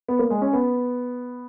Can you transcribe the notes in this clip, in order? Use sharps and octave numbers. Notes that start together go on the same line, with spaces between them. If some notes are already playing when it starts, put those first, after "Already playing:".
B3
A#3
G#3
C#4
B3